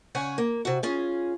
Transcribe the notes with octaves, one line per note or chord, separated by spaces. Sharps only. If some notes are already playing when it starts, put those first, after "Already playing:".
C#3 C#5 F#5 G#5
A#3
C3 F#4
C#4 F4 G#4